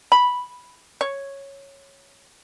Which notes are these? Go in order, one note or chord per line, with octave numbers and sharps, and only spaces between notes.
B5
C#5